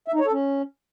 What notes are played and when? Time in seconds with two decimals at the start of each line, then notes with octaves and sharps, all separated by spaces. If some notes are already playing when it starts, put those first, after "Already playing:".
0.08 E5
0.14 D#4
0.20 C#5
0.26 A4
0.32 C#4